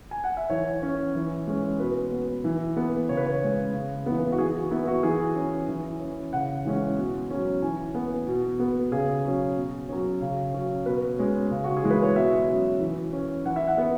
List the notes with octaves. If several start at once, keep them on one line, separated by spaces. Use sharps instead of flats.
G#5
F#5
E5
E3 C#5
C#4
E3
G#3 C#4
B2 B4
B3
E3
B3
C#3 C#5
B4
C#5
G#3 C#4
C#3
E3 B3
F#4
E3 G#4
F#4
B3 E4
F#4
E3 G#4
C#4
E3
C#4
C#3 F#5
E3 G#3 C#4
B2
F#3 C#4
E3 G#5
B3
B2
B3
C#3 G#4
F#3 C#4
B2
F#3 C#4
C#3
F#3 C#4
B2 B4
G#3 C#4
C#3
F#4
G#4
E3 G#3
B4
C#5
B2 E5
F#3 C#4
E3
C#4
E3 F#5
E5
F#5
B3